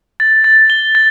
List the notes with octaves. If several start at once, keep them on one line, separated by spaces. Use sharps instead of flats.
A6
A6
G7
A6